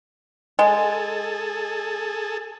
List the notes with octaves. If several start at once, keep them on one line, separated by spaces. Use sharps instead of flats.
G#3 G#4 A4